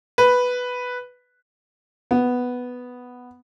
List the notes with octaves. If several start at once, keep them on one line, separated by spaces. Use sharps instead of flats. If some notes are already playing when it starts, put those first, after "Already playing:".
B4
B3